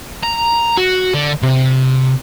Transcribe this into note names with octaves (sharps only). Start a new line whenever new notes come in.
A#5
F#4
D3
C3